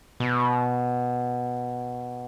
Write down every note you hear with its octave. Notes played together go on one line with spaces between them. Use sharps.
B2